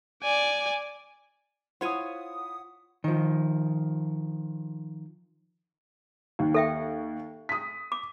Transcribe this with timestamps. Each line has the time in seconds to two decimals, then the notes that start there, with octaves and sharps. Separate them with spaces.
0.23 D5 G#5
1.81 E4 F4 C5 C#5 F#5 G#5 D#6
3.04 D#3 F3
6.39 D#2
6.54 A4 E5 G5
7.49 D#6 B6
7.92 D6